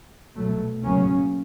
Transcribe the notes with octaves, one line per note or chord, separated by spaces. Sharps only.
B2 F#3 A3
C#3 F#3 A#3 C#4